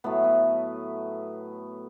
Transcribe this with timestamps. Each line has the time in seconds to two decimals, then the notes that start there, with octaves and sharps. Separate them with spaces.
0.04 A2 F#3 A3 B3
0.24 B3